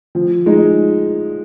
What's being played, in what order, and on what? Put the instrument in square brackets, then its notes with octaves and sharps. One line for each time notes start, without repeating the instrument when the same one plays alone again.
[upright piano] F3
G#3 D#4